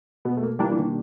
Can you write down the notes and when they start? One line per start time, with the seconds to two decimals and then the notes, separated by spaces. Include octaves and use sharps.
0.25 B2 B3
0.37 A3
0.43 A#3
0.59 E3 G3 A#3 D4
0.72 E3
0.77 D#3